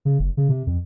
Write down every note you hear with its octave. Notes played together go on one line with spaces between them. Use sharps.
C#3
F#1
C#3
C3
F2